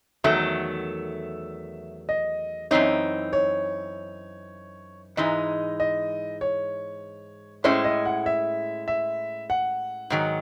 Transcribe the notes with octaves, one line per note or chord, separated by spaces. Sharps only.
E2 D#3 F#3 A3 E5
D#5
F#2 E3 C4 D#4 C#5
C#5
G#2 E3 G#3 D#4 D#5
D#5
C#5
A2 G#3 C#4 E4 C5
D#5
F#5
E5
E5
F#5
G#2 D#3 F#3